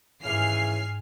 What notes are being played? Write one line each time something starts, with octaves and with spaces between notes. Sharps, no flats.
D#2 G#2 C#3 E3 G#5 F6 C7